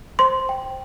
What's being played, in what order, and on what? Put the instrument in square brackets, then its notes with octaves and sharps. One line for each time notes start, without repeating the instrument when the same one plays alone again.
[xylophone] C5 C6
G5